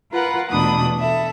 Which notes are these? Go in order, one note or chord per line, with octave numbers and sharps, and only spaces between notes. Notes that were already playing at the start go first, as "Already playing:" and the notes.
F4 A#4 B4 F#5 B5
E2 B2 A3 D4 B5 D#6
A4 E5